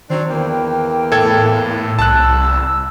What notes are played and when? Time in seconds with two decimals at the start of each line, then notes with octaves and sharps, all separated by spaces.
0.10 D#3 F#3 C4 D4
0.30 E2 A#3 G5
1.12 A2 A4 G#6
1.99 C2 A5 E6 F#6